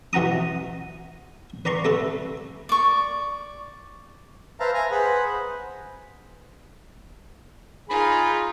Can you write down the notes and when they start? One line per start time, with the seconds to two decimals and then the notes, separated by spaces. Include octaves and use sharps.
0.13 B2 E3 F#5 A#5 D#6
1.65 B4 D5 A#5 C6 C#6
1.85 A3 A4 B4
2.69 D5 C#6
4.60 B4 C5 E5 F5 A5 A#5
4.74 G#5 A#5
4.91 G#4 B4 C5 F#5 B5
5.26 C5
7.89 D#4 F4 G#4 B5